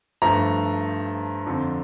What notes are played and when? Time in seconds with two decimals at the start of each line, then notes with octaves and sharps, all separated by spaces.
0.22 G2 F3 A3 A#5
1.47 F2 D3 F3